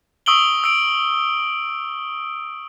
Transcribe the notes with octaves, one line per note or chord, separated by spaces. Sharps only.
C#6 D#6 E6 D7 F#7 G7
E6 D7